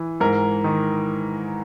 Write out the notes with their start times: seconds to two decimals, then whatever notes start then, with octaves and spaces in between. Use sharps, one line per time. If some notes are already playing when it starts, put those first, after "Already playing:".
Already playing: E3
0.20 G#2 A#4
0.64 D#3